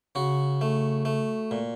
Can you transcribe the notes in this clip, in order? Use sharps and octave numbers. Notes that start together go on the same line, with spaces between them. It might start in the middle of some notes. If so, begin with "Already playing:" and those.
C#3 F#4
A3
A3
A#2